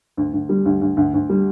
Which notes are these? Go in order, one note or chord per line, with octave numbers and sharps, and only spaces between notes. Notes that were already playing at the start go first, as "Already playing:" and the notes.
D2
D2
G3
D2
D2
D2
D2
G3